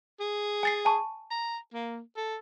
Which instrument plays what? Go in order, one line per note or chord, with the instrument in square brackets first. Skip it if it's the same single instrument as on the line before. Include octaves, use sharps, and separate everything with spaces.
[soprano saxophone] G#4
[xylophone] G#5 A6 C7
G#5 A5 C#6
[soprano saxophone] A#5
A#3
A4